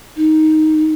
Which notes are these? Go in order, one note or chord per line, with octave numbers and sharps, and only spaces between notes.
D#4